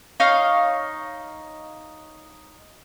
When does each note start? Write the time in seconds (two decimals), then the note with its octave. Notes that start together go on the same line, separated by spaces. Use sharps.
0.20 D#4 C#5 D#5 F5